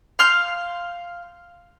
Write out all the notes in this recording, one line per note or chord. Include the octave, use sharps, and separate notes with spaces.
F5 C6 F6 G6